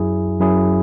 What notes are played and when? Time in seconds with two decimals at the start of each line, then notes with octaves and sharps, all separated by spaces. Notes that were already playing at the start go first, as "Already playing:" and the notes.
Already playing: F#2 F#3 E4 G#4
0.40 F#2 F#3 E4 G#4